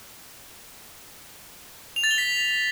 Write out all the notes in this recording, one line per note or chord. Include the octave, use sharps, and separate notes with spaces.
F7
A6
G7
B6